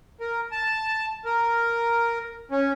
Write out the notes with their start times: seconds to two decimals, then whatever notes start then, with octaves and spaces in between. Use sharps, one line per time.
0.21 A#4
0.52 A5
1.25 A#4
2.51 C#4